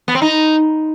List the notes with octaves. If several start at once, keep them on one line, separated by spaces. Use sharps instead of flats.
B3
C4
D#4